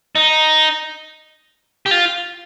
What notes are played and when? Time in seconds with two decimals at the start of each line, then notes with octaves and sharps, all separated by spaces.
0.15 D#4
1.86 G4
1.91 F4